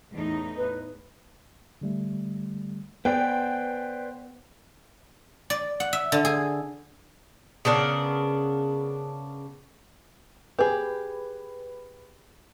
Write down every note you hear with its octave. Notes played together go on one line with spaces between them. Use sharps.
E2 A2 D#4
B4
D3 G3 A3
B3 B4 C5 D5 G5 G#5
D5
F#5
E5
D3
G#4
C#3 B3 D4 A#4
G4 G#4 B4